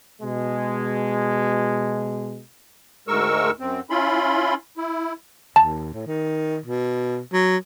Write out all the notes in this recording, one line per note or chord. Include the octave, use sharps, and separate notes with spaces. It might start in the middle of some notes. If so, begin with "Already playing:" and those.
B2 G#3
D2 G#2 G#3 A#4 C#6 E6
F#2 C4
C#4 E4 F4 B5 C6
E4
D#2 A5
A2
D#3
B2
F#3